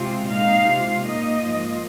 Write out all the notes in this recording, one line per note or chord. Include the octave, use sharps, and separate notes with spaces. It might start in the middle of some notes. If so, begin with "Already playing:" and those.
Already playing: C3 G#3 C4 F4
A#2 G#3 D#4 F5
C3 G#3 F4
A#2 A#3 D#4 D#5
G#2 F3 A#3 F4